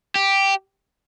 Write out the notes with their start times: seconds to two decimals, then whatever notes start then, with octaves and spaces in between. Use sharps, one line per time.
0.15 G4